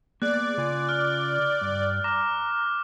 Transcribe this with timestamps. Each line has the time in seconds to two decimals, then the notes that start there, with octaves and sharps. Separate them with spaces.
0.22 A#3 B3 G#4 D5 F#6
0.57 C#3 F4 G#5
0.89 F6
1.61 G2
2.04 A#5 D6 F6